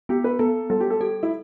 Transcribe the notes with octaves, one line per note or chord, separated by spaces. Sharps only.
B3 G4
B4
B3 A4
G3 A4
G4
A4
G4 A4
E4